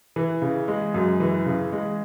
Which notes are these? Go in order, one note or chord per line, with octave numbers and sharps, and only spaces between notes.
E3
C#3
G#3
F#2
E3
C#3
G#3